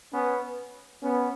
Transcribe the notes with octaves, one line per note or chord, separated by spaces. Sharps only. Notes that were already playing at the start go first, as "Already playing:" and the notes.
B3 C#4
B3 C#4